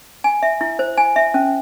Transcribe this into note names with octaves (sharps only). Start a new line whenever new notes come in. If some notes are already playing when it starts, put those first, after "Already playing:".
G#5
E5
E4
C5
G#5
E5
C#4